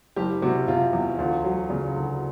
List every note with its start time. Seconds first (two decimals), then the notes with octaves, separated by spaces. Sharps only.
0.16 F#1 G4
0.42 C3 F#4
0.68 C3 F4
0.93 E2
1.19 D2 F4
1.44 F#3
1.70 C#3
1.96 D2